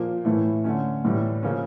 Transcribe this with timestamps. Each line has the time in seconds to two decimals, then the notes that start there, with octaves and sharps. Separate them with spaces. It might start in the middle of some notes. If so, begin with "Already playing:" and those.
Already playing: A#2 F3 A#3
0.25 A2 E3 A3 E4
0.64 D3 A3 C#4
1.04 A2 E3 G3
1.43 C#3 F3 A#3 C#4